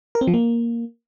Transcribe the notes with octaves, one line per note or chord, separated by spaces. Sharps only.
A#4
C4
F3
A#3